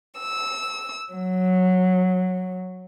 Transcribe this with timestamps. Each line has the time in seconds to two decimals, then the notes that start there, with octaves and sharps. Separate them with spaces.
0.19 E6
1.11 F#3